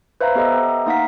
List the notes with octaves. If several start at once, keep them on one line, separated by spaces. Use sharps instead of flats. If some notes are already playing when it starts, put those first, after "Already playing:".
B4 C5 E5 F5 A#5
B3 G4 A4 D#5 E5 A#5
A#3 D#4 F5 F#5 A#5 B6